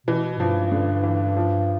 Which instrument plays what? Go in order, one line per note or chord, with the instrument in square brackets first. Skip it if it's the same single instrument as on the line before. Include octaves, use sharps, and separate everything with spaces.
[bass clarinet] B2 [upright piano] E3
[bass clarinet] G2 [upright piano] F3
[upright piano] D3
E3
F3